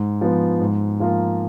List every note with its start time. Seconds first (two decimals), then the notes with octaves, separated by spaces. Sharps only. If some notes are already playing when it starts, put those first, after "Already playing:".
Already playing: G#2
0.21 F3 B3
0.61 G#2
1.00 F3 A#3 F4 A#4